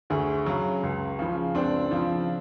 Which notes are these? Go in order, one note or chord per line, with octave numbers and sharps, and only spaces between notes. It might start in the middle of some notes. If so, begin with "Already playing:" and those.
D2 F#4 G#4
C#3 F#3
C#2
C#3 F3
C#2 C4 D4
C#3 F3